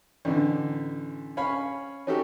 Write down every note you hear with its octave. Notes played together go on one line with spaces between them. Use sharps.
A1 D3
C#4 C#5 F5 B5
C#4 D#4 F#4 G4 A4